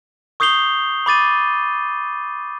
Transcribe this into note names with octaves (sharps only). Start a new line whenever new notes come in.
C#6 D#6 G6 C7 F7 G7
B5 D6 A6 D#7